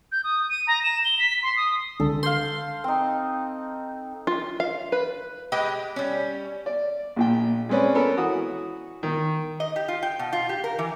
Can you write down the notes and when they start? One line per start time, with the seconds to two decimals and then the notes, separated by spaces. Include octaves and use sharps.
0.12 G6
0.24 D#6
0.49 D#7
0.67 A#5
0.83 E7
1.05 G7
1.19 B6
1.43 C6
1.57 D#6
2.00 C#2 D3 A4
2.23 C5 F5 C6
2.84 C4 D#4
4.27 F4
4.60 F5
4.92 B4
5.52 G#3 G4 B4 D#5 G5
5.96 G3 C#4
6.66 D5
7.16 A#1 A#2 G5
7.69 G#3 C4 C#4 B4 D5
7.95 B3 C#4 A4 A#4
8.17 E3 F#4 F#5 D#6
9.03 D#3
9.60 D#5
9.76 G4
9.88 F4
10.03 G5
10.19 B2
10.33 F4
10.49 G4
10.64 A#4
10.79 E3